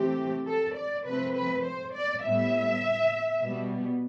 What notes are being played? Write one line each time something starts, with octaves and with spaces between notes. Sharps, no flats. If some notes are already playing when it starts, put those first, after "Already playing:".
Already playing: C3 E3 A3 C4 G4
A4
D5
C3 F3 A3 C4 B4
B4
C5
D5
A2 G3 B3 E5
B2 G3 B3